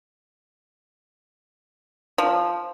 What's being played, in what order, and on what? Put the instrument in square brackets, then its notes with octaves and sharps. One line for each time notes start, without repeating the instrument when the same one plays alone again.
[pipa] F3